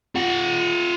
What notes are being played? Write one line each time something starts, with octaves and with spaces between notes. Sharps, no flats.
F4 F#5